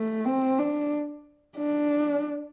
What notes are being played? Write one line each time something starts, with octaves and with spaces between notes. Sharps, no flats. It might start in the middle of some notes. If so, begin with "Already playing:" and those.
Already playing: A3
C4
D4
D4